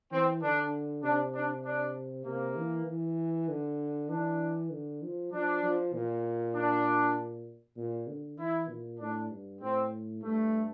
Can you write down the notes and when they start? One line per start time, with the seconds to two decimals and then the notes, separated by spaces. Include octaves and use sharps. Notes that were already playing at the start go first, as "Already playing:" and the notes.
0.12 E3 C4
0.43 D3 D4
1.03 C3 D4
1.35 D4
1.66 D4
2.26 C3 A#3
2.56 E3
2.87 E3
3.49 D3
4.10 E3 D4
4.71 D3
5.02 F3
5.33 F3 D4
5.64 F3
5.94 A#2
6.55 D4
7.77 A#2
8.08 D3
8.39 E3 E4
8.69 A#2
9.00 A2 D4
9.30 G2
9.61 A2 C4
10.23 G2 A3